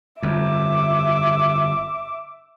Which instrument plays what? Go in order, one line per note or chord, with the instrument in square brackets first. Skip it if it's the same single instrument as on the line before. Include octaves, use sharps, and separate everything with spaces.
[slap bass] G1 F2 [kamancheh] E5 D6